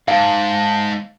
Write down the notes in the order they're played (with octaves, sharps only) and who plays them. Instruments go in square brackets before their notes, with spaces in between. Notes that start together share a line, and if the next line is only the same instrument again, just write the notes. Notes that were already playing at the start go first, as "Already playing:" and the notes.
[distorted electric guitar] G#2 [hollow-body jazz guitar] F5 [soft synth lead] A5